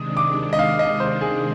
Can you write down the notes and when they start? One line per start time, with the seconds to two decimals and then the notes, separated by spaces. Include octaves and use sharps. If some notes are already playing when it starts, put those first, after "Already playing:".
Already playing: C3 D#3 G#3 D4 D#6
0.17 D6
0.53 D#5
0.59 F5
0.79 D#5
1.00 C5
1.21 G#4